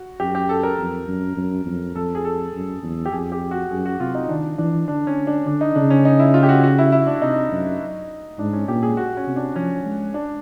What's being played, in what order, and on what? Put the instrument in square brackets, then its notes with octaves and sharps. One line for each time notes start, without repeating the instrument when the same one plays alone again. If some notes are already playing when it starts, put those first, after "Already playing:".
Already playing: [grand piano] F#4
[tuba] F#2 [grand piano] G4
[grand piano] G4
A4
A#4
[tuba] F2
F#2
F#2
F2
[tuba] F2 [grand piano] A4
[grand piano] G#4
A4
[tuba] F#2
E2
[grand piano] G4
[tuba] F2 [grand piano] G#4
[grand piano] G4
F#4
[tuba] F#2 [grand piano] G#4
[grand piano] F#4
[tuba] C3 [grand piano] F4
[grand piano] D#4
[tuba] D#3 [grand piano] D4
[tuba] E3 [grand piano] D4
[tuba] D3 [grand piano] D4
[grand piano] C#4
D4
[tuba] D3 [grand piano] D4
[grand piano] D#4
[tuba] C#3 [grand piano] D4
[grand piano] C#4
D#4
E4
F4
G4
F#4
F#4
E4
E4
D4
[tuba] C3 [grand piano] D#4
[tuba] F#2
[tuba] G#2 [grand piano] D4
[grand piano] C#4
[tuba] A#2 [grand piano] G4
[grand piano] G#4
F#4
C#4
[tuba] C3
[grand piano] D4
[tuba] F3 [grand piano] C#4
[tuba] G#3
[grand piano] D4